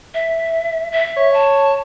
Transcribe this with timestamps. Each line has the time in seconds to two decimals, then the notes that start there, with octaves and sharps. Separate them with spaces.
0.14 E5
0.92 E5
1.17 C#5
1.34 A5